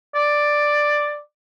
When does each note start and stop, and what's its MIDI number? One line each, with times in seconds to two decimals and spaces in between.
0.15 1.18 74